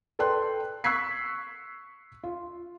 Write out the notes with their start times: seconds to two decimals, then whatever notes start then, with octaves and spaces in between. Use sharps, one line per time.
0.19 A4 B4 D5 G5 C6 F#6
0.84 C#6 E6 F#6 G#6 B6 C7
2.23 F4